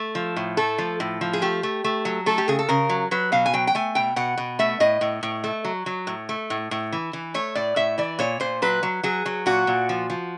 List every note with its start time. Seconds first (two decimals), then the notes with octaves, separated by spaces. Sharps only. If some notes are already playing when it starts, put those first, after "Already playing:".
Already playing: A3
0.15 F3
0.36 A2
0.57 A3 A4
0.78 F3
1.00 A2
1.21 F3
1.33 G#4
1.42 A3 G4
1.63 A3
1.84 A3
2.05 F#3
2.26 A3 A4
2.38 G4
2.48 C#3 G#4
2.59 A4
2.69 C#3 A#4
2.89 F#3
3.11 F#3 B4
3.32 B2 F5
3.46 G#5
3.54 F#3 G5
3.67 G5
3.75 A3 G#5
3.95 B2 G5
4.16 B2 F#5
4.37 B2
4.59 A3 E5
4.80 A2 D#5
5.01 A2
5.23 A2
5.44 A3
5.65 F#3
5.86 F#3
6.07 A2
6.29 A3
6.50 A2
6.71 A2
6.93 E3
7.13 E3
7.34 A3 C#5
7.55 A2 D5
7.76 A2 E5
7.98 E3 D5
8.19 A#2 C#5
8.40 A#2 C5
8.62 F#3 B4
8.83 F#3
9.03 F#3 G#4
9.26 F#3
9.46 A#2 F#4
9.67 A#2
9.89 F3
10.10 F3